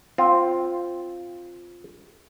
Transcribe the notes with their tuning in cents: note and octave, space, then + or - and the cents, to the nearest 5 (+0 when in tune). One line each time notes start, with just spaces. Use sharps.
C4 +0 F4 +0